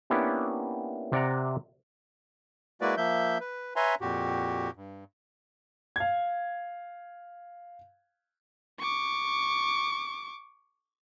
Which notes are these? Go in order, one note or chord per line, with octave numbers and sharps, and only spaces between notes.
A#3 B3 C#4 D4 E4 G4
C3 D5 F#5 A#5
G#3 A#3 E4 F#4 B4 D5
F3 A#3 E5 G6
B4
B4 C#5 E5 G#5 A#5 C6
F2 A#2 F#4 G4
G2
F5 G#6
C#6 D6